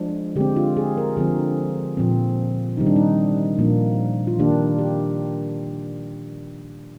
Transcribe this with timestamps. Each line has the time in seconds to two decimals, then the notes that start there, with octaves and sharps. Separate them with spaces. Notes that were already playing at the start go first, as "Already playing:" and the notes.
Already playing: F3 G#3 D4
0.36 D3 G#3 C4 G4
0.56 F4
0.77 G#4
0.97 A#4
1.17 D3 F3 C4 G#4
1.97 A#2 F3 C4
2.77 C3 D#3 G3 C4 D#4
2.86 D4
2.96 D#4
3.59 A#2 F3 A#3 D4
4.27 F4
4.39 D#3 A#3 D4 G4
4.79 G4